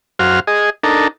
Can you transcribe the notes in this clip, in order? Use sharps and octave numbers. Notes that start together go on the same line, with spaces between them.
F#2 F#4 C5 F5 F6
G#4 D#5
D4 D#4 A4 A#4